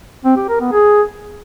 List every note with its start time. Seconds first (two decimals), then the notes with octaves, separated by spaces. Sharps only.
0.25 C4
0.37 G4
0.49 A#4
0.61 B3
0.73 G#4